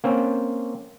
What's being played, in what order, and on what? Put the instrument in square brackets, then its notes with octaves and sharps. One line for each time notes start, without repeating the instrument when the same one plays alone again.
[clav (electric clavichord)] A#3 C4 C#4